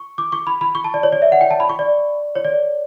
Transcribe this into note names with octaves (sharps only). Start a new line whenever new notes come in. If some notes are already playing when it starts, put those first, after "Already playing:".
Already playing: C#6
D6
C#6
B5
B5
C#6
A5
D5
C#5
D5
E5
F#5
G5
A5
B5
C#6
D5
C#5
D5